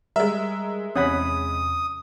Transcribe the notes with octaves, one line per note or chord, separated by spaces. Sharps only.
G3 G#3 A#4 E5
E2 C3 C#4 F#5 B5 D#6